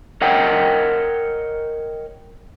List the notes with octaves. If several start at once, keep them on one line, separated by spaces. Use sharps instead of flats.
A#4 C#5 D#5 F#5 G5